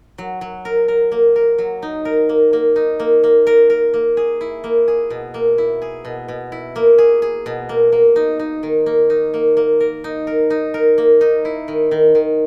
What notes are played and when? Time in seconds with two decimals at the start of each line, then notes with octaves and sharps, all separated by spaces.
0.18 F#3
0.41 F#3
0.65 A#4
0.88 A#4
1.12 A#3
1.36 A#4
1.58 F#3
1.82 D#4
2.05 A#4
2.29 A#3
2.53 A#3
2.76 D#4
3.00 A#3
3.24 A#3
3.47 A#4
3.70 A#4
3.94 A#3
4.17 G#4
4.41 E4
4.64 A#3
4.88 G#4
5.10 B2
5.34 A#3
5.58 E4
5.82 G#4
6.05 B2
6.28 B2
6.52 E4
6.76 A#3
6.98 G#4
7.22 G#4
7.46 B2
7.69 A#3
7.92 A#3
8.16 D#4
8.39 D#4
8.63 D#3
8.86 A#3
9.10 D#4
9.34 A#3
9.57 A#3
9.80 A#4
10.04 D#4
10.27 A#4
10.50 D#4
10.74 A#4
10.98 A#3
11.21 D#4
11.45 E4
11.68 D#3
11.91 D#3
12.15 D#3